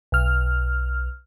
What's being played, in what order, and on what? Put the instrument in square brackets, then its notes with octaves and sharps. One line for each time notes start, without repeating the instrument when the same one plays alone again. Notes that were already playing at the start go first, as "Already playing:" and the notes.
[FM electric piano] B1 F6